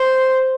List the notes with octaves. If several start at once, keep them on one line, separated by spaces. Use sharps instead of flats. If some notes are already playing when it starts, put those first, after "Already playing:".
Already playing: C5